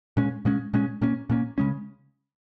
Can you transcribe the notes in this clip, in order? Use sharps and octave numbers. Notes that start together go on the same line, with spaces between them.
A#2 G#3 C#4
A#2 G#3 C#4
A#2 G#3 C#4
A#2 A#3 C#4
A#2 A#3 C#4
C#3 G#3 C#4